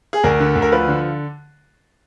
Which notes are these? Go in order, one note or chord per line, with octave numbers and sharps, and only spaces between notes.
G#4
D2 A#4
D3
D2
A#4
F3 B4
D3